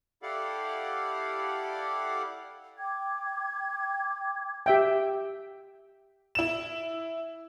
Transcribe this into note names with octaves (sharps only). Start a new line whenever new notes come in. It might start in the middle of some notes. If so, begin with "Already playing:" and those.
E4 G4 A4 D5 F5 F#5
G5 D6 G#6
G4 E5 G5
E4 E7